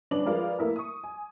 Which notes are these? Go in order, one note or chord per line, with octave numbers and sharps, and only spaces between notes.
G1 C#4 D4 B4 D6 F#7
F3 G#3 A#4 B4 D5 F5
A3 A#3 E4 A#4
C#6 D#6
G#5